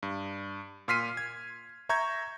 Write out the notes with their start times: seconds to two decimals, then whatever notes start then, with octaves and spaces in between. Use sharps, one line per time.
0.03 G2
0.88 A#2 C6 F6 B6 C7 D#7
1.17 G#6
1.89 E5 A#5 C#6 G6 G#6